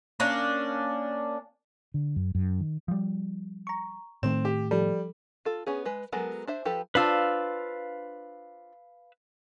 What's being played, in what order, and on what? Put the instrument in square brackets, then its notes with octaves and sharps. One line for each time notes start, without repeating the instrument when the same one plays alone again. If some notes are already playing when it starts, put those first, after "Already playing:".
[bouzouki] A#3 C#4 D4
[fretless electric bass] D3
F#2
F#2
D#3
[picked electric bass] F3 G3
[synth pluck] A#5 C#6
[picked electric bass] A2 D#3 A3 [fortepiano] C4 [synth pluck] E7
[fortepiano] G4
[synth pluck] F3 A4 [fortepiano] G3
[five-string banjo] F4 A4
B3 C#4 G#4
G#3 B4
F#3 G#3 B3 A4 A#4
D4 C5 E5
F3 G4 A4 B4
[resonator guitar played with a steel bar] D4 F4 C5 [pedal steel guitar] B4 F5 E6